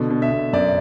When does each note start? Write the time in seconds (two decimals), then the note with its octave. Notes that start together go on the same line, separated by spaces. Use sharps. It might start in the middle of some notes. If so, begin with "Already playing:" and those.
Already playing: B2 D3
0.10 B2
0.22 E5
0.32 B2
0.53 F#2 D5